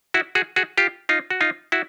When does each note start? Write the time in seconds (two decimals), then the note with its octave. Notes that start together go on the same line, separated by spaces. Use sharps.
0.14 E4 F#4
0.35 F#4 G#4
0.56 F#4 G#4
0.78 F4 G4
1.09 D#4 F4
1.30 F#4
1.41 D#4 F4
1.72 E4 F#4